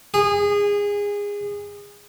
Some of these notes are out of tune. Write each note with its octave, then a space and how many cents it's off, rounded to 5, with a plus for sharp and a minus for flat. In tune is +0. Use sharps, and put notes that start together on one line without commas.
G#4 -25